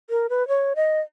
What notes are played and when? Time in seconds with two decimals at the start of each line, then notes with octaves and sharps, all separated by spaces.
0.10 A#4
0.30 B4
0.48 C#5
0.76 D#5